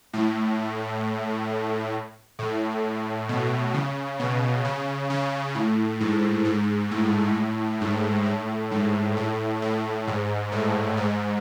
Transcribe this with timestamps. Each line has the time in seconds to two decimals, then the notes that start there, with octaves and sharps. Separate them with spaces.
0.13 A2
2.39 A2
3.29 B2
3.74 C#3
4.19 B2
4.65 C#3
5.10 C#3
5.55 A2
6.00 G#2
6.45 G#2
6.91 A2
7.81 G#2
8.26 A2
8.71 G#2
9.17 A2
9.62 A2
10.07 G#2
10.52 A2
10.97 G#2